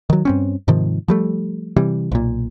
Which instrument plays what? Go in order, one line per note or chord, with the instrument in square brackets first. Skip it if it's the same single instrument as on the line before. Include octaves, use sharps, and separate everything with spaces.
[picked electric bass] D#3 F#3
G2 C4 C#4
G#2 C3 D#3 F3
F3 G3 A3
C3 E3 G3
B1 A#2